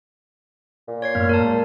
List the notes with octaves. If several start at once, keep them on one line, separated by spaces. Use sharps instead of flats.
A#2
C#5 G#6 C7
F#2 A2 A#3 F6
A#4 A5
G#3